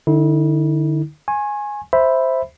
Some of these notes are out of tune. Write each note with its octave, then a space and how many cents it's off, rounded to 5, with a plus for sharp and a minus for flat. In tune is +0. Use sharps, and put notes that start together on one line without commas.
D3 +25 E4 -35
G#5 +0 C#6 -45
C5 +0 E5 +0 B5 +0